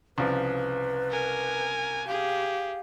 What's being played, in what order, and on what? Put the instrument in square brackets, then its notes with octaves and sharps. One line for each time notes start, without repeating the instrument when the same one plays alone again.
[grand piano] C2 C#3 F3 [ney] B4
[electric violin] A#4 G#5
[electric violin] G4 G#4 [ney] F5